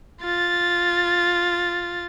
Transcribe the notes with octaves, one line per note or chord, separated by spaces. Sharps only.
F4 A6